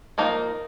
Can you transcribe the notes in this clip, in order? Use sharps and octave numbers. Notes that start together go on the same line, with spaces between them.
F3 A#3 D#4 A#4